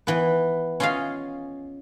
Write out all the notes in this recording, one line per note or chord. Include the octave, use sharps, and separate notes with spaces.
E3 B3
C#4 F4 G#4 D#5 F5 G#5